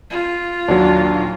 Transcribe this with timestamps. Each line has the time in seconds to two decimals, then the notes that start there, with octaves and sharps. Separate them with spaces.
0.10 F4
0.68 D#2 A#2 F#3 D4